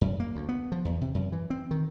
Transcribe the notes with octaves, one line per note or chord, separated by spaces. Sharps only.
F#2
A#3
D2
B3
F3
E2
C3
F#2
E3
C4
D#3